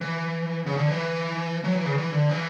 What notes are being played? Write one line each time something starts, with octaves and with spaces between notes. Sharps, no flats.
E3
C#3
D3
E3
F#3
E3
C#3
E3
D3
E3